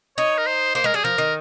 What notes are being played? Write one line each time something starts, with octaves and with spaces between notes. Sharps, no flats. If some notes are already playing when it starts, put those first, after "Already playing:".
D#4 C#5
A#4
C5
A#3 C5
G#3 A#4
G3 G#4
F3 A#4
D#3